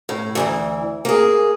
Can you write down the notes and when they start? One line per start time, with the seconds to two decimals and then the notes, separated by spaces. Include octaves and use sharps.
0.09 A2
0.35 D2 G#2 E3
1.05 A#3 G#4